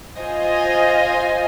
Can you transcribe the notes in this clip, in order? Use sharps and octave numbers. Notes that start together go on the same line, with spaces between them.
F4 C5 D#5 G#5